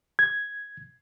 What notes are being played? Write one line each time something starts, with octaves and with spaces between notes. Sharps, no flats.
G#6